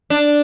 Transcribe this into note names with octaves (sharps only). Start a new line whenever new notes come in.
D4